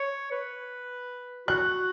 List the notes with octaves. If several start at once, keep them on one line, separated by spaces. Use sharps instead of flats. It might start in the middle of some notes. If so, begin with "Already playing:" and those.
Already playing: C#5
B4
F#4 F#6